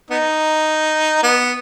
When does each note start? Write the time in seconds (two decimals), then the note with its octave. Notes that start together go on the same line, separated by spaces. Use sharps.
0.10 B3 D#4
1.23 B3